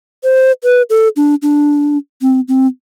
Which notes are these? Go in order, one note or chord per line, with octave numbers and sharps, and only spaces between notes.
C5
B4
A4
D4
D4
C4
C4